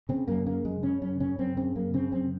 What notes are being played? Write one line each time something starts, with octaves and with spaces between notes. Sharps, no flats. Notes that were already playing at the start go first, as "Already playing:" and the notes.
C#3 C4
F#2 A#3
C#3 A#3
F#2 G#3
C#3 C#4
F#2 C#4
C#3 C#4
F#2 C4
C#3 C4
F#2 A#3
C#3 C4
F#2 C4